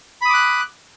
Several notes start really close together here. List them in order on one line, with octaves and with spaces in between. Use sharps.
B5 D#6 D6 F#6